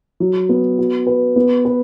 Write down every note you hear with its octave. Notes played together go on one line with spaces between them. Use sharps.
F#3
B3
F#4
B4
B3
B4